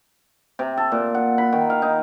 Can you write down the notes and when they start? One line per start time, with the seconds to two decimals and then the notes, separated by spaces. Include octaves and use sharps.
0.59 C3
0.77 A4
0.92 A#2
1.15 F#5
1.38 B5
1.53 D#3
1.70 F5
1.82 D#4